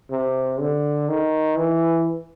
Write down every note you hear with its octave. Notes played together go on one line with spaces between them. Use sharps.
C3
D3
D#3
E3